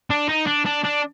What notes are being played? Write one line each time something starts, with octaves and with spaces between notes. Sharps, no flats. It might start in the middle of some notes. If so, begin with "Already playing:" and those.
D4
D#4
D4
D4
D4